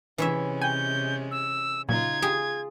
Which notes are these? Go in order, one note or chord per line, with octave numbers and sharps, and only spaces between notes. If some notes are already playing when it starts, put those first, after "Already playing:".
C3 E3 G#3 C#4 C#5 E5
G5 G#5 G6
E6
A#2 C#3 F#3 D#4 F4 G#6
F4 G4 G#4